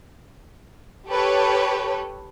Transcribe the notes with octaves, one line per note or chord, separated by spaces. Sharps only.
G4 A4 B4 C#5